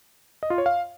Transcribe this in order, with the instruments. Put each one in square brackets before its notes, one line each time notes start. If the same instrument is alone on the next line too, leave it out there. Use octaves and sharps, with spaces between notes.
[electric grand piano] D#5
F4
C#5
F5